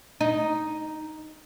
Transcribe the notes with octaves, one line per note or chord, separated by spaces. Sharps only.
D#4